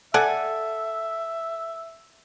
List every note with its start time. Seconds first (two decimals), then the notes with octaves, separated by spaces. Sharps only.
0.14 A4 D5 E5 F#5 G#5